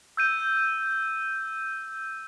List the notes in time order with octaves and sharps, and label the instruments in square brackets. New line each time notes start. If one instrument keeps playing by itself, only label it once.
[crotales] E6 G6 D#7